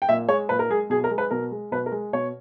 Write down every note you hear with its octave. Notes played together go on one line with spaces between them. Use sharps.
G5
A#2 E5
G#3 C#5
A#2 B4
A#4
G#3 G#4
B2 G#4
A#4
G#3
B4
B2 A#4
G#3
B2 B4
A#4
G#3
B2 C#5